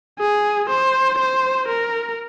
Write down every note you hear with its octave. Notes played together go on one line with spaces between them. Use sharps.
G#4
C5
C5
A#4